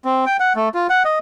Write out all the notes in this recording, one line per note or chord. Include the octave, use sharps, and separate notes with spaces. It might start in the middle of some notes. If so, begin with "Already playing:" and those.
C4
G5
F#5
A3
F4
F#5
D#5